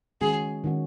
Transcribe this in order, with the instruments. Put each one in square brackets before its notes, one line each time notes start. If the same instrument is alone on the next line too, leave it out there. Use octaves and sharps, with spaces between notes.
[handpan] D#3 G#3 C#4 F#4 [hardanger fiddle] G#4
[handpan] D#3 G#3 C#4 F#4